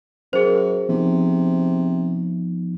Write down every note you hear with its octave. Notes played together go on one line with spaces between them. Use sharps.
F#2 G#4 A#4 C5
C3 F3 B3 D#4